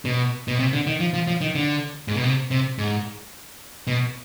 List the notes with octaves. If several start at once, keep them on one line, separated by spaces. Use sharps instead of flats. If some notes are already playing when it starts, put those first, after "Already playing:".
B2
B2
C3
D3
D#3
F3
F3
F3
D#3
D3
G#2
B2
C3
C3
G#2
B2